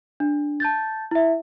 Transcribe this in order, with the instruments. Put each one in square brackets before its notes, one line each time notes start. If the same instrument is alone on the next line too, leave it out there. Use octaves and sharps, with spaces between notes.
[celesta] D4
A5 G6 A6
E4 E5